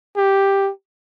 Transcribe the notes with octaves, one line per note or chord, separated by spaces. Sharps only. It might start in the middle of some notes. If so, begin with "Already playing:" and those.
G4